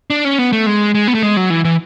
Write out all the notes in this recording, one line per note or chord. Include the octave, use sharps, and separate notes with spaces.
D4
C#4
B3
A3
G#3
G#3
B3
A3
G#3
F#3
E3
E3